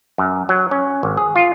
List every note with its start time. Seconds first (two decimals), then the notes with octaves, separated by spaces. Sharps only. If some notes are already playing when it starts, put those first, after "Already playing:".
0.18 F#2
0.49 F#3
0.71 C#4
1.03 G#1
1.17 G#4
1.36 F4